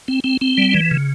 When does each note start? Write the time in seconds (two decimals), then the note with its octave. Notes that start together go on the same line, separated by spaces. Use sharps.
0.08 C4
0.24 C4
0.41 C4
0.58 G3
0.74 E3
0.91 C#3